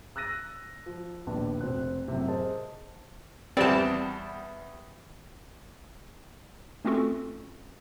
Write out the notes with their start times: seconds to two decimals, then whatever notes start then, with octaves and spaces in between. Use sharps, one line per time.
0.16 E6 F#6 A6 A#6 D#7
0.86 F3
1.27 A#1 D#2 B3 D4
1.61 F1 C4 F#6
2.08 F#2 A2 C3
2.28 G#4 A#4 C5 D#5 A5
3.57 E2 G3 B3 C4 D5 A5
6.85 A3 C4 C#4 F4 F#4 A4